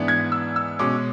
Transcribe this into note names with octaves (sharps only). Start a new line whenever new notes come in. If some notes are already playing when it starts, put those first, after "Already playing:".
Already playing: G#2 E3 B3 D4
G#6
E6
E6
B2 G#3 C#4 D6